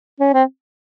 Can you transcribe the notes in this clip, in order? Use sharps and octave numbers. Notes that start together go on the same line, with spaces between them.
C#4
C4